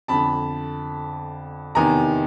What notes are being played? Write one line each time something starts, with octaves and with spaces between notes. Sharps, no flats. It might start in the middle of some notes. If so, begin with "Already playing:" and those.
F2 D3 A5 B5
E2 C3 D#3 G#5 A#5